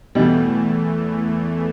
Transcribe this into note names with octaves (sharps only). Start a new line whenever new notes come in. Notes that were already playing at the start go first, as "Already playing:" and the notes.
E2 B2 E3 G3 A3